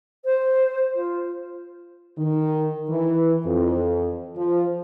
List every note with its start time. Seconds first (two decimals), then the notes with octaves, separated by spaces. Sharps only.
0.25 C5
0.95 F4
2.18 D#3
2.89 E3
3.45 F2
4.36 F3